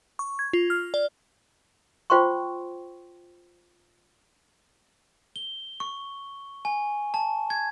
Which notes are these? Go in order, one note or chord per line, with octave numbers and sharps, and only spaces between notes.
C#6
G#6
F4
F6
D5
F4 C5 G5 C6 C#6
G7
C#6
G#5
A5
G#6